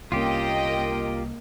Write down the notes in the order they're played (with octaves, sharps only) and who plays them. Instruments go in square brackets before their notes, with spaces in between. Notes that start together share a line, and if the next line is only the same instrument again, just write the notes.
[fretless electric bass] C2 F3 C#4 [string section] A#3 [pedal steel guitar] F4 G4 [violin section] D#5 G5